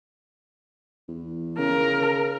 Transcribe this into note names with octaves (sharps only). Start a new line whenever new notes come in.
E2
C#3 A#4